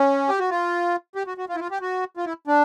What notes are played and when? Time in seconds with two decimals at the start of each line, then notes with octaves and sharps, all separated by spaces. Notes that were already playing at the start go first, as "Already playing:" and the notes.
Already playing: C#4
0.29 G4
0.39 F#4
0.50 F4
1.15 G4
1.27 F#4
1.38 F#4
1.49 F4
1.55 E4
1.60 F4
1.71 G4
1.81 F#4
2.17 F4
2.26 E4
2.47 D4